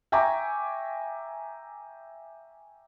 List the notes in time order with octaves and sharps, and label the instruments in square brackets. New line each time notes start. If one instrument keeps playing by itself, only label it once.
[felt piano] E5 G5 G#5 A#5 C#6 D6